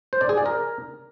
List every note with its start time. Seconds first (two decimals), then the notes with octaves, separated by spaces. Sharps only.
0.13 C5
0.21 D5
0.29 G#4
0.37 D5
0.46 A#4